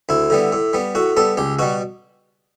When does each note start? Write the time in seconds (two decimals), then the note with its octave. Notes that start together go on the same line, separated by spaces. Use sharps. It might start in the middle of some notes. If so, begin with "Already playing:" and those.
0.09 D2 E4
0.30 D3 G3 B3
0.53 A2
0.73 G3 B3
0.95 A2 F#4
1.17 G3 B3 A4
1.37 C#2 G4
1.59 B2 G3 F#4